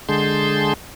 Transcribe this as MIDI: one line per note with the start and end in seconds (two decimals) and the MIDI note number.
0.09 0.74 50
0.09 0.74 56
0.09 0.74 68
0.09 0.74 81
0.09 0.74 84
0.09 0.74 91